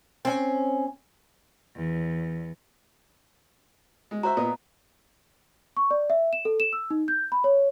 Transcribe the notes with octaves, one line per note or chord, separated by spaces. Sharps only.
C4 C#4
E2
G#3
F#4 C5 E5 A#5
A#2 B3 D#5
C#6
D5
E5
E7
A4
E7
E6
D#4
G6
B5
C#5